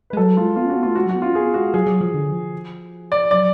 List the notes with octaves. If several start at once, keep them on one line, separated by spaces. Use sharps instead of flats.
B4
G#3
F#3 A4
G#3 F4
B3 F4
C#4 F#4
B3
A3 F4
G#3 F#4
F#3 F#4
B3
C#4 F4
B3 G#4
G#3 F#4
F#3 G#4
F#3
F3
D3
F3
D5
F#3 D5